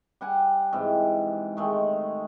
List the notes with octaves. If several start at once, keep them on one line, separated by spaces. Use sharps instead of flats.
G3 F#5 G#5
G#2 C3 E3
D#3 G#3 A3